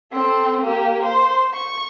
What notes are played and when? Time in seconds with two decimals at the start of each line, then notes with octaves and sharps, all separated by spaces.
0.13 C4 A4
0.62 A#3 G4
1.02 C5
1.54 C#6